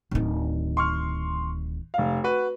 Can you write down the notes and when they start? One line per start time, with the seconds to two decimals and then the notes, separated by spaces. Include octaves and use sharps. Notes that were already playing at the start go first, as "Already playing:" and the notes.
0.11 D1 D#3
0.77 C6 C#6 F6
1.94 F1 F5
2.24 F#4 B4